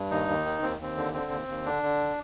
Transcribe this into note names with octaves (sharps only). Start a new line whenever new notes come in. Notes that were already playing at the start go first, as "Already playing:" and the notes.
Already playing: G2
D#2 D#4
D#2
D#3
D#2 C4
D#2 C4
D3
D3 C4
D#2
D#2
D3 D4
D3